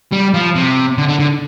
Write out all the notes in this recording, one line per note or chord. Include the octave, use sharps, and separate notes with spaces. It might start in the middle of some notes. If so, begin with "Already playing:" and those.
G3
F3
C3
D3
D3
D3